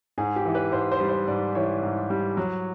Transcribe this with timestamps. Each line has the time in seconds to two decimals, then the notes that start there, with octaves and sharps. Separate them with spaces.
0.18 G#2 G#4
0.36 G4
0.45 E3
0.55 B4
0.72 G#2 C5
0.92 C5
1.00 G3
1.09 C5
1.27 G#2 D5
1.55 E3 C#5
1.83 G#2
2.10 G3
2.37 F#3